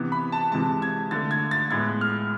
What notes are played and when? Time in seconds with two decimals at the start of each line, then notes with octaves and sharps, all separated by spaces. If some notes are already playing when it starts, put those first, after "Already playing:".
Already playing: C3 E3 B3
0.12 B5
0.32 A5
0.52 C3 E3 G#3 A5
0.82 G#6
1.11 D3 A3 A6
1.31 G#6
1.51 A6
1.71 A2 G#3 B3 G#6
2.01 F6